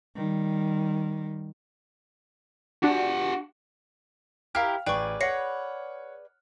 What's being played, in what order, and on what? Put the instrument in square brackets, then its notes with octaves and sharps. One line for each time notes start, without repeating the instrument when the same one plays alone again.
[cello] D#3 G3
[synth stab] D4 F#4 [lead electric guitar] G4 F#5
[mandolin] E4 G4 A#4 [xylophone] F5 G5 [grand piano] F6
[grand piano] A1 [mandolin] G#4 B4 D5 [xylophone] G5 C#6
[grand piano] C#5 F#5 [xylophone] A#6 C7 C#7